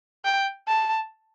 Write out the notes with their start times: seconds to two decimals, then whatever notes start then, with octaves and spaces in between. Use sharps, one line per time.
0.25 G5
0.67 A5